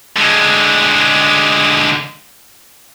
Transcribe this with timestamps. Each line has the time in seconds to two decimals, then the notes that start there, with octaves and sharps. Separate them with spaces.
0.16 D3 G#3